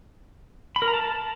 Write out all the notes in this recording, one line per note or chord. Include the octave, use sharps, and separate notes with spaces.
B5
A#4
A#5
A5